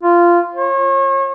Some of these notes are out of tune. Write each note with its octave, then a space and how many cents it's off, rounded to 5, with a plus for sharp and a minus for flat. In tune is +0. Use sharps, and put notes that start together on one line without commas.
F4 -15
C#5 -35